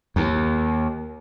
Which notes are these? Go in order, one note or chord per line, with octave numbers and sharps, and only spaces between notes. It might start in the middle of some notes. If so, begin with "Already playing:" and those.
D#2